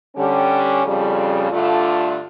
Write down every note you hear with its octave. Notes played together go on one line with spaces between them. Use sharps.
D3 G3 C#4
F2 C#3 G3
G2 D3 A3 D4 F4